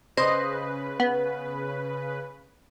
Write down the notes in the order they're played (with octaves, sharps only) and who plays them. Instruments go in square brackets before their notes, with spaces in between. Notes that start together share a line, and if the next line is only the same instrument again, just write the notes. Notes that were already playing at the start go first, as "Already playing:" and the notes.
[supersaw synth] C#3 B4 [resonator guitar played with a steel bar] C5 [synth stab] D#5
[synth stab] B3